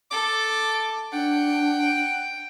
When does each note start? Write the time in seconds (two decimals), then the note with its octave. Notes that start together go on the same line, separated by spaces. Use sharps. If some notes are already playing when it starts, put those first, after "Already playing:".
0.11 A4 D6
1.13 D4 F#5 G5